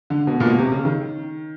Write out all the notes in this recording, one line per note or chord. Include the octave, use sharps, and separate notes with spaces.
D3
B2
A#2
B2
C3
C#3
D#3